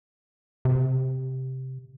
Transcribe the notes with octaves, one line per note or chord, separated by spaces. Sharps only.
C3